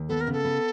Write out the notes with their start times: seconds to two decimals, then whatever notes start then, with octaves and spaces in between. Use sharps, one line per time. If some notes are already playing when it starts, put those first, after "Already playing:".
Already playing: D#2
0.09 B3 A4
0.21 A#4
0.27 C#3
0.33 A4
0.45 B3